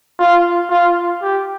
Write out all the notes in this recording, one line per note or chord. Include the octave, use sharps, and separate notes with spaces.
F4
F4
G4